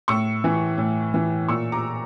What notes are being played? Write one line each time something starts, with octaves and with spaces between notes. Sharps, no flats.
A2 C#6 E6
E3
A2
E3
A#2 C#6 E6
A#5 D6